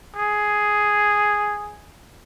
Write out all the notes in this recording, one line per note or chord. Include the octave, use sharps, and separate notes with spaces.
G#4